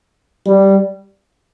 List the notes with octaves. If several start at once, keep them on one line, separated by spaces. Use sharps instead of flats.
G3